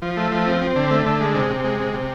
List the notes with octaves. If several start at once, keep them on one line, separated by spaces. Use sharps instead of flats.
F3
A3
F3
C4
C4
D3
A3
D3
G#3
C3
C3
G#3
C3
C3